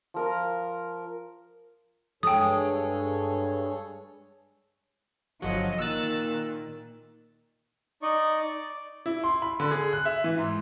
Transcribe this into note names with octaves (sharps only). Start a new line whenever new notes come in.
F3 A#4 A#5
G2 G#3 G#4 A4 C#5 G5 D#6
G1 F3 F#3 D#5 C#7
A#2 D#3 E6 F#6 A6
D#4 D5 D#5 C#6
D5
E4
C6
B5
D3
G#4
F#6
E5
E3
G#2